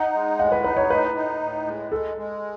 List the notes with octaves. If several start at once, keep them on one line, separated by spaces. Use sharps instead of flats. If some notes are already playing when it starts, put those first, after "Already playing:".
Already playing: D#4 F#5
G#3
A2 F#5
B4
D#4 B4
C#5
A2 B4
D#4
A2
G#3
G#3 A4
G#3